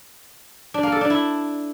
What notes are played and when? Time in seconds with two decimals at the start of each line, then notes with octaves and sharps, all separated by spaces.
0.74 D4
0.83 A#3
0.92 A4
1.01 D4
1.10 E4